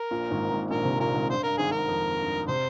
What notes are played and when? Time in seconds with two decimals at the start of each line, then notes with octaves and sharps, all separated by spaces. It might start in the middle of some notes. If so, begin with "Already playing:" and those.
Already playing: A#4
0.11 A#1 A#2
0.31 G#1 G#2
0.50 G#1 G#2
0.70 A#1 A#2 A#4
0.85 C2 C3
1.00 A#1 A#2 A#4
1.15 G#1 G#2
1.30 G2 C5
1.43 G2 A#4
1.58 G#1 G#2 G#4
1.71 G2 A#4
1.88 F2
2.19 G2
2.48 C3 C5